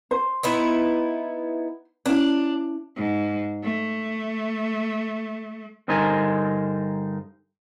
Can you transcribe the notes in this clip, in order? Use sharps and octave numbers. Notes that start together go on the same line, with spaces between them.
C5
B3 D#4 E4
C#4 D4 E4
G#2
A3
G2 D3 D#4 A#4 C5 G#5